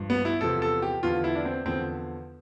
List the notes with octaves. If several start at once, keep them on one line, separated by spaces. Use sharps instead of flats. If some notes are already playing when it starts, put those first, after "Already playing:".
Already playing: G2 F3
B3
E4
E2 C3 F3 A4
A4
G4
E2 D3 F3 F4
E4
D4
C4
E2 D3 F3 C4